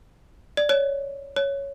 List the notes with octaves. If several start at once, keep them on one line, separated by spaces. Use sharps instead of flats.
D5
C#5
C#5